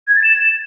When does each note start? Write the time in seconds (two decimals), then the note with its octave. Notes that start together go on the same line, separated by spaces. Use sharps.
0.08 G#6
0.16 A6
0.24 E7